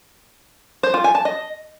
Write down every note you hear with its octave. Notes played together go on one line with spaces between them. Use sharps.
C5
F4
G#5
A5
D#5